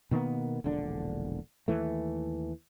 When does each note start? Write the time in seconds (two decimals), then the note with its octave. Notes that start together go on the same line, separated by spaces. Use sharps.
0.11 B2 D#3 A#3 B3
0.64 E1 A#1 D3 D4
1.68 D#2 E3 A3